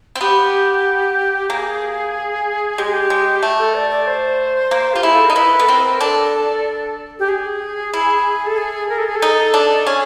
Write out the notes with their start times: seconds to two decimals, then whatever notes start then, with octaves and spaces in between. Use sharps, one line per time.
0.15 C4
0.21 B3 G4
1.49 A#3 G#4
2.78 G#3 G4
2.85 G#4
2.93 G4
3.10 G#3
3.43 A3
3.59 A4
3.75 D5
3.91 D5
4.07 C5
4.71 A#3
4.94 F4 G4
5.03 E4 G#4
5.15 A4
5.25 D#4 A#4
5.36 E4 B4
5.52 B4
5.59 B3 A4
5.68 C4 A#4
5.84 A#4
6.00 D4 A4
7.19 G4
7.29 G#4
7.93 E4
8.46 A4
8.58 G#4
8.89 A#4
8.98 A4
9.07 G#4
9.16 A4
9.22 D#4
9.54 D4
9.87 C#4 G#4